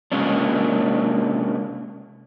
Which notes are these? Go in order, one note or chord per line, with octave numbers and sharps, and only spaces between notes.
C3 G#3 A#3 C#4 D4